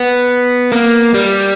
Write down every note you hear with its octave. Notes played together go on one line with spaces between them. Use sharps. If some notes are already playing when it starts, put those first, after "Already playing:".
Already playing: B3
A#3
G3